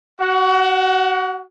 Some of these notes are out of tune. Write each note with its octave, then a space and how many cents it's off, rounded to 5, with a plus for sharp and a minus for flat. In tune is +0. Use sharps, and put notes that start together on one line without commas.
F#4 +30 F#5 -10